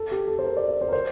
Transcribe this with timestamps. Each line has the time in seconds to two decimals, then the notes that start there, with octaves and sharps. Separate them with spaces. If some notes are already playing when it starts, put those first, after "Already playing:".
Already playing: A4
0.11 G4
0.27 A4
0.39 C5
0.44 A#4
0.57 D5
0.68 D5
0.81 C5
0.89 A#4
0.93 C5